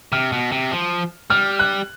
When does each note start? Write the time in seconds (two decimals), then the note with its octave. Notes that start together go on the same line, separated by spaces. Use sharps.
0.12 C3 F6
0.32 B2
0.52 C3
0.71 F3
1.30 G3 F6
1.59 F#6